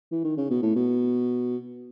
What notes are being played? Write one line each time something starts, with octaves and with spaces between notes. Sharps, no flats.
E3
D#3
C#3
B2
A2
B2